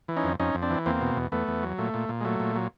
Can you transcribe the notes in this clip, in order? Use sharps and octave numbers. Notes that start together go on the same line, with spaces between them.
E3
C#4 D#4
F2
F2 C#4 D#4
F2
C4 D4
E3
E2 A#3 C4
B2
E2
E2 A3 B3
E2
F#3
A#2 A3
A#2
A#2
G#3
F#3 A3
A#2
F#3